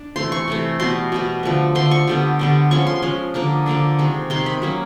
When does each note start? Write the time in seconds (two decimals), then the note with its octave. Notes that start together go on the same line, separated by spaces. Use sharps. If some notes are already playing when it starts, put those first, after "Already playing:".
Already playing: D4
0.16 C3 E3 A3 C6
0.32 C#6
0.48 C3 E3 A3
0.80 B2 G3 B3 C6
1.12 B2 G3 B3
1.43 D3 F3 A3
1.75 D3 F3 A3 C6
1.91 C#6
2.07 D3 G3 B3
2.39 D3 G3 B3
2.71 F3 G#3 C#4 C#6
2.87 C6
3.02 F3 G#3 C#4
3.34 D3 F3 A#3 D4
3.66 D3 F3 A#3 D4
3.99 C3 D#3 G#3
4.30 C3 D#3 G#3 C6
4.46 B5
4.62 F#3 A#3 C#4